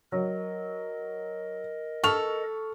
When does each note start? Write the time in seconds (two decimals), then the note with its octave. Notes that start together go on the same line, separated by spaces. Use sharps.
0.12 F#3 A#4 D#5
2.04 A4 C#6 F6 F7